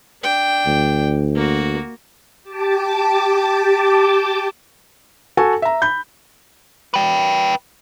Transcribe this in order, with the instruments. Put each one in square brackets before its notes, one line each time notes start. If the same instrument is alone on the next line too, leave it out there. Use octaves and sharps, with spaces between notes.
[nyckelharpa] D4 G5
[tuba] D2
[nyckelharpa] A#3 F#4
[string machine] G4 A5 D6
[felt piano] F#4 A4 G#5
E5 A#5
B5 G6
[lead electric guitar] B4 G5